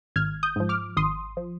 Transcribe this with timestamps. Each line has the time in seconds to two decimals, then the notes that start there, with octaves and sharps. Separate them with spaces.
0.16 G#1 F6 G#6
0.43 D#6 G6
0.56 G#2 F3
0.69 D6 F6
0.97 G#1 C6 D#6
1.37 F3